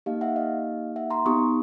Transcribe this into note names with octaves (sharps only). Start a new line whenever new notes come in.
A#3 D#4 G4 D#5 F5
E5 F#5
D#5 F5
E5 F#5
A#5 C6
B3 D#4 G4 C#6 D#6